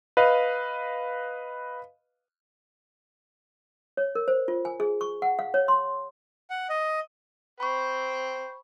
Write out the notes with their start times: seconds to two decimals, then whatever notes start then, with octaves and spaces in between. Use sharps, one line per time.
0.17 B4 D#5 F5
3.97 C#5
4.15 A#4
4.28 C5
4.48 F4
4.65 G#5
4.80 G#4
5.01 C#6
5.22 F#5
5.39 F5
5.54 C#5
5.68 C6
6.50 F#5
6.69 D#5
7.60 C5 G5 B5 C#6